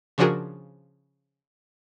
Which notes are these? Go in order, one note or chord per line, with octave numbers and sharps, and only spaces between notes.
C#3 F3 D4 F#4 G#4 A#4